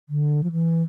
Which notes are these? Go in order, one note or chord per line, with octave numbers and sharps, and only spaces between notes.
D3
F3
E3